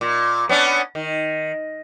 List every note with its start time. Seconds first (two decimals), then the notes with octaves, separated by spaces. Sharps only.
0.01 A#2
0.49 B3 C#4 D4
0.95 D#3